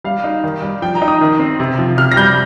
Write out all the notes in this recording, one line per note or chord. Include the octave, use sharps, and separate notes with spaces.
G3 F5
D#4
D#3
G3
F3 G5
A#5
D#4
D#6
D#3
C4
C3
F3
C3 F6
A#6
G3 G6